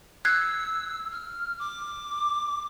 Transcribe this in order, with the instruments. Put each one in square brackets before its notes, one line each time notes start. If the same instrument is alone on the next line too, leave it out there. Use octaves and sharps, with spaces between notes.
[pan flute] E6 [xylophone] F#6 G#6 C7
[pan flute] F6
D6